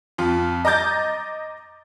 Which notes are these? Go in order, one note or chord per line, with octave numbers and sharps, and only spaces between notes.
F2 F4
D#5 A#5 D6 G6 A6